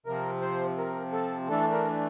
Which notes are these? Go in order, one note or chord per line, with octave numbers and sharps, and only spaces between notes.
C3 F3 C4 A#4
C5
A#4
A4
E3 A3 D4 A4
A#4